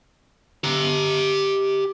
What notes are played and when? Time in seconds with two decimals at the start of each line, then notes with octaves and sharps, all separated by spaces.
0.64 G4 A#5